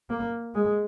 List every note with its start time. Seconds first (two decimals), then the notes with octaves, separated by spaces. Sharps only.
0.10 A#3
0.55 G#3